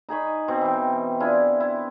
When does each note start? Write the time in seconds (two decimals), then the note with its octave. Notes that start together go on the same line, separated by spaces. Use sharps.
0.09 D#4 G#4 B5 C#6
0.48 B2 C4
0.61 E3 G5
1.20 D4 E4 F4 G#4
1.60 E4